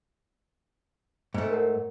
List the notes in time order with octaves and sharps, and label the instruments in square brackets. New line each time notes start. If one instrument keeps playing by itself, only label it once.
[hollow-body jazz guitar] G#2 A3
[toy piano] A#4 C#5 F#5